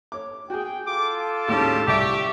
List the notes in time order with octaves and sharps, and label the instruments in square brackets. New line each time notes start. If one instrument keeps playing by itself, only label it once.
[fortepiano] C#5 D6
[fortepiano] F#4 G#4 [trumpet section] G5
[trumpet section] F4 A4 [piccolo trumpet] D6
[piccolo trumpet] A5
[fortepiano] D#2 A2 D4 [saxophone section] C#3 G3 G4
[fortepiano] C2 [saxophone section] G4 [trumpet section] D5 E5 C#6